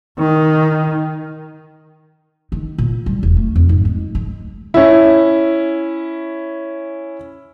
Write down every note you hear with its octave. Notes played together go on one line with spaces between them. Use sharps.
D#3
D#3
A#2
G3
E1
A3
F2
G#2
G#3
G#3
C#4 E4